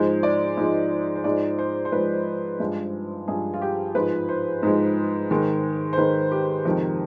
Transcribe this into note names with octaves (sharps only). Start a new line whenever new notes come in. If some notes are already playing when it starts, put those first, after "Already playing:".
Already playing: G#2 F3 G#3 C5
D5
G#2 F3 G#3 D#5
C5
G#2 F3 G#3 D5
C5
C5
G#2 F3 G#3 B4
G2 F3 G#3
G2 F3 G#3 G#4
F4
G4
G#2 F3 G#3 B4
C5
G#2 F3 G#3
G#2 D#3 G#3
C5
G#2 D#3 G#3 B4
G4
F2 C3 D#3 G#3